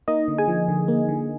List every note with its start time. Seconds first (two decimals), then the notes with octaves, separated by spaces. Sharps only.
0.08 A#3 D#4 D#5
0.28 D3
0.38 G#4 G#5
0.48 F3
0.68 D3
0.88 A#3
1.09 D3